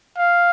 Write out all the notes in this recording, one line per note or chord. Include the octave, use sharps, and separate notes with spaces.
F5